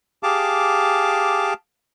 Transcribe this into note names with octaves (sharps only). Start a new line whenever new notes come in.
G4 G#4 F5 A5 D6